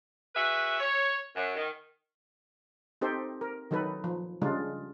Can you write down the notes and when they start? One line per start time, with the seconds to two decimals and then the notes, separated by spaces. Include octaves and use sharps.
0.35 F#4 G#4 B4 E5
0.80 C#5
1.35 F#2
1.56 D#3
3.01 C4 D#4 G4 A4 C5
3.41 A#4
3.71 D#3 F#3 D#4 A4 B4
4.04 F3
4.42 C#3 G3 G#3 D4 F4